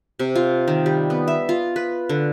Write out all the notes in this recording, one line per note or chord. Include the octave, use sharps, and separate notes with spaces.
C3
F4
D#3
G3
B3
E5
F4
B4
D3